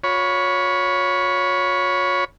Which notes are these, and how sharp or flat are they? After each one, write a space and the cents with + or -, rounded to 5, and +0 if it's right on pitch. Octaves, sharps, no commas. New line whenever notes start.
F4 +40 C#5 +5 B5 -10